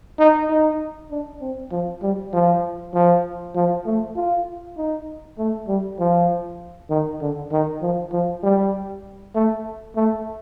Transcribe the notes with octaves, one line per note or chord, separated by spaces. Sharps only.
D#4
D#4
D4
C4
F3
G3
F3
F3
F3
A3
F4
D#4
A3
G3
F3
D#3
D3
D#3
F3
F3
G3
A3
A3